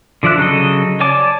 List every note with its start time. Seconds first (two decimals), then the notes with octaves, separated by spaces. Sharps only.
0.23 D3 F3 D5 E5 F#6
0.38 C#3 F#3 A4 D#5
1.00 C#5 D5 G#5 A5 D6